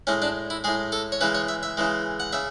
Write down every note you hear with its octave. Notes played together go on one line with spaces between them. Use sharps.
A2 G#3 C#4
D4
E4
A2 G#3 G#4
A4
C#5
C#3 E3 G#3 B4
C#5
E5
E5
C#3 E3 G#3
F#5
C#3 E5